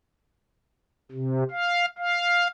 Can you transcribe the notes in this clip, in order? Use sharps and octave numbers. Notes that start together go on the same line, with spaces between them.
C3
F5
F5